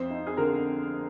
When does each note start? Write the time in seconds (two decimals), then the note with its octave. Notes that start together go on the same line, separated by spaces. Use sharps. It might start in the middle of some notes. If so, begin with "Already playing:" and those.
Already playing: F2 C4 C5
0.10 D#4
0.27 G#4
0.37 D3 A#4